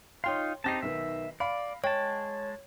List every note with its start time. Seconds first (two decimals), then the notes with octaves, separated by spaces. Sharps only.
0.24 D#4 F4 C#5 F5 G5 C6
0.64 C4 D#4 G4 A5 A#6 C7
0.82 B1 D#3 B3 E5
1.40 D5 F5 B5
1.84 G#3 C#5 G5 A5